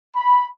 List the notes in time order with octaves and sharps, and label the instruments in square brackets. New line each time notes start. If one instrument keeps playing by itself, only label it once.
[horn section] B5